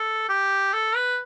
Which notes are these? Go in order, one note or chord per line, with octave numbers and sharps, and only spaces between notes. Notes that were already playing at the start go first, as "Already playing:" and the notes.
Already playing: A4
G4
A4
B4